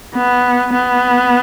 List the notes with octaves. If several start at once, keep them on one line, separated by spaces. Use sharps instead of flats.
B3
B3